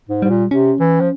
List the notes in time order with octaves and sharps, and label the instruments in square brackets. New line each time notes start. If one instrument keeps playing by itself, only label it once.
[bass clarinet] G#2
[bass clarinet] G#2 [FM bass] G3
[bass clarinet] A#2
[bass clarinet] C3 [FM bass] C#4
[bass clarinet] E3
F3